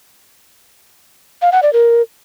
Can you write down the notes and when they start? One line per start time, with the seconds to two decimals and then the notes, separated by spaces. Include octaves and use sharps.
1.42 F5
1.52 F#5
1.63 D5
1.73 A#4